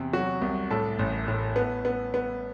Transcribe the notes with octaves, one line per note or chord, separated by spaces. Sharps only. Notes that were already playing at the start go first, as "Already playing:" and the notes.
Already playing: E2 C3
F#3 F#4
C2
A2 A4
A1
A2
B3
B3
B3